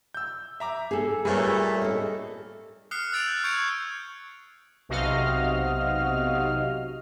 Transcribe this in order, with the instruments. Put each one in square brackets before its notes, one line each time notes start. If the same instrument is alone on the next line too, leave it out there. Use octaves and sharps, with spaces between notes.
[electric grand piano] E6 G6
E5 A#5 D6
[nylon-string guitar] G#4 A4
[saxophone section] A#2 A3 [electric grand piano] G3 B4 [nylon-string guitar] G#4 A4 C#5
[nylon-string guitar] A4 D#5
[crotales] D#6 F6 F#6 C7 C#7
E6 F#6 A6 D7 F7
G6
C#6 G6 G#6 C#7 D7 F7
[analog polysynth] B1 C3 F#4 D#5 F5 F6